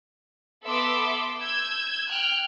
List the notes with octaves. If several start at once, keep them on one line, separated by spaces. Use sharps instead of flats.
B3 A4 B4 E5 C6 D6
E6 G6 G#6
G5 F6 F#6